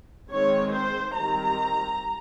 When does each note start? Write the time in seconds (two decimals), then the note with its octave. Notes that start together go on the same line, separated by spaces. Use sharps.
0.30 D#3 G#3 C4 C#5
0.73 C5
1.15 D#3 G3 C4 A#5